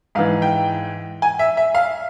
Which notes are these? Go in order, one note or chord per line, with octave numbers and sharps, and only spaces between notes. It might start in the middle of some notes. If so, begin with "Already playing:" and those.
G#2 E3 F5
G5
G#5
E5
E5
F5